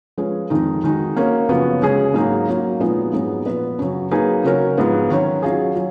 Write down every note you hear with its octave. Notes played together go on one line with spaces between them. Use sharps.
F3 G#3 C#4 G#4 B4
F2 D#3 G#3 D#4
D#3 G#3 D#4 F#4
A#3 C#4 F#4 A#4
F#2 C#3 F3 B3 F#4
C#3 G#3 C#4 G#4
G#2 F#3 A#3 D#4
F#3 A#3 C#4
A#2 F3 G#3 B3 D#4
G#2 F#3 B3
A#2 F3 B3 F4 B4
F#2 C#3 F#3
F#3 A#3 D#4 G#4 B4
C#3 F#3 C#4 F#4 A#4
G#2 F3 B3 F4
D#3 F#3 C#4 F#4 C#5
F#3 C#4 F4 G#4
F#3